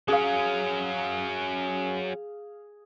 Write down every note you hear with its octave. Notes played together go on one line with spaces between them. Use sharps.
F#3 C#4 G#4 F5